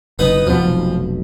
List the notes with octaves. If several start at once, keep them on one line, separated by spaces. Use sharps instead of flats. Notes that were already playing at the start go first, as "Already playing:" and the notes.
F#1 B3 D#4 B4
D#2 B2 F3 B3
F1 B1